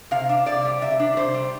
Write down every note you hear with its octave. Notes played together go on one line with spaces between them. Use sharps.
C3 F5
D4
C3 D5
G3
C3 E5
D4
C3 C5
G3